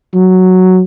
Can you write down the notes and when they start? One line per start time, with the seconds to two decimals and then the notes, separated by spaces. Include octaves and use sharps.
0.14 F#3